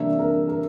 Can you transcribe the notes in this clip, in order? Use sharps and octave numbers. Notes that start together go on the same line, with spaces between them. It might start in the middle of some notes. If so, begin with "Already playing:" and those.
Already playing: C3 E3 G3 A#3 D4 E5
A#4
A#4